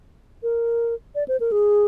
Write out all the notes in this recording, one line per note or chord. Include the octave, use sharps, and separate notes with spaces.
A#4
D5
C5
A#4
G#4